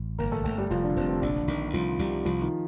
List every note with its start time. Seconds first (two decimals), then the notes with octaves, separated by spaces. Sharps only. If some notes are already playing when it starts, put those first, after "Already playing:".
Already playing: A1
0.19 G1 A#3 A#4
0.32 A3 A4
0.44 G1 A3 A4
0.58 G3 G4
0.71 F1 F3 F4
0.84 D3 D4
0.96 F1 C4
1.09 C4
1.22 A#1 D3 D4
1.48 A#1 D#3 D#4
1.73 C2 F3 F4
1.99 C2 G3 G4
2.25 C2 F3 F4
2.42 D#3 D#4